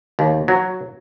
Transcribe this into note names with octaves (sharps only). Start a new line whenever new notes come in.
D#2
F#3